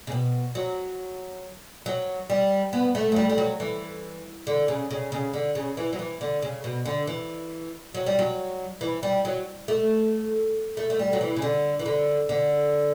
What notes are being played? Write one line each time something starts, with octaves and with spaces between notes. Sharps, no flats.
C#3
B2
F#3
F#3
G3
B3
A3
F#3
G3
G3
F#3
E3
D3
C#3
C#3
C#3
D3
C#3
E3
F#3
E3
D3
C#3
B2
D3
E3
F#3
G3
F#3
E3
G3
F#3
A3
A3
A3
G3
F#3
E3
C#3
D3
E3
D3
D3